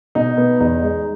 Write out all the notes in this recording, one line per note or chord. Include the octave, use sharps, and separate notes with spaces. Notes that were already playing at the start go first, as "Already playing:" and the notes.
B2 D#4
B3
E2 D#4
G#3